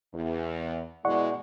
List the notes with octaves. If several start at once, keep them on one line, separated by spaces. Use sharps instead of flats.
E2
B2 G#3 E4 D5 F#5 C#6